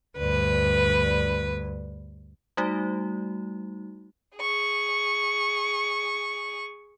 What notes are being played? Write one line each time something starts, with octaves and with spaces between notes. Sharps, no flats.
D2 G2 B4
G3 A3 D#4 F#4
G#4 C#6